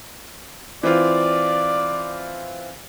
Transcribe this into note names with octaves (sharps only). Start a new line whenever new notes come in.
E3 C4 F4 D5